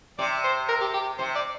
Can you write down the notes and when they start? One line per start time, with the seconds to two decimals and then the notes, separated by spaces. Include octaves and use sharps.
0.18 C3 D5
0.44 C5
0.69 A#4
0.81 G4
0.94 G4
1.18 C3 C5
1.35 D5